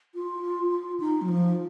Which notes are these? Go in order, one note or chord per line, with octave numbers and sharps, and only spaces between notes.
F4
D#4
F#3
F3